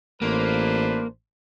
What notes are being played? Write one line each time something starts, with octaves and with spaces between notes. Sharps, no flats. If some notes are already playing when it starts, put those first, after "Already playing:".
A1 A#3 D4 B4 C5